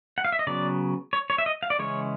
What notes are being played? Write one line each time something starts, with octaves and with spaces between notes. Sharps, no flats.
F#5
F5
E5
D#5
C#3 F#3 B3 D5
C#5
C#5
E5
D#5
F5
D5
C#3 E3 G#3 C#4 C#5